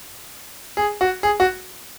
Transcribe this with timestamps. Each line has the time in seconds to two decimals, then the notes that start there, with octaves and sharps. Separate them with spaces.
0.77 G#4
1.01 F#4
1.23 G#4
1.40 F#4